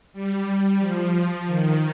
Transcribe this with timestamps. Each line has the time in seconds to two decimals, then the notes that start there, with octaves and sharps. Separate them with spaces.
0.13 G3
0.79 F3
1.47 D#3